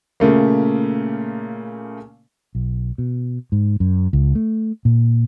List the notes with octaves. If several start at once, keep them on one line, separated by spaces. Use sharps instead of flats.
A#2 C#3 A3 A#3
B1
B2
G#2
F#2
C#2
A3
A#2